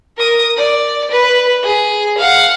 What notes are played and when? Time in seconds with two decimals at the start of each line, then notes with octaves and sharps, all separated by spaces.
0.17 A#4 D#6
0.57 D5
1.11 B4
1.63 G#4
2.18 F5 F#5